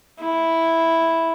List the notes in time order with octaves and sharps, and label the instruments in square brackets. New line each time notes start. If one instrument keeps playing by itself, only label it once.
[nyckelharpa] E4